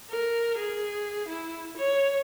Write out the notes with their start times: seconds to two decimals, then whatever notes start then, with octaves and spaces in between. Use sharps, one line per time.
0.11 A#4
0.58 G#4
1.28 E4
1.77 C#5